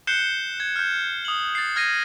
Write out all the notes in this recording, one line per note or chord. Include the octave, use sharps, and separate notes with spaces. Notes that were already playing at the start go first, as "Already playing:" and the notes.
F#6 G6 C7 C#7 E7 G7
G#6
F6 G6
D#6 F#7
A6 C7
F6 G#6 A#6 C7 D#7